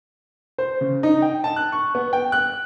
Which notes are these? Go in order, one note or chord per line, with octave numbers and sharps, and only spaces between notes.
C5
C#3
D#4
G5
A5
F#6
C#6
B3
G5
F#6